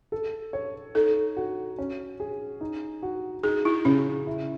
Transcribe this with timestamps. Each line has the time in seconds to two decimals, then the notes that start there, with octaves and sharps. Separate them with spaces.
0.12 A4
0.53 C#5
0.95 D#4 A4
1.37 F#4
1.79 C#4
2.20 G#4
2.61 D#4
3.03 F#4
3.43 D#4 G#4
3.65 E4
3.85 C#3 C#4
4.27 E4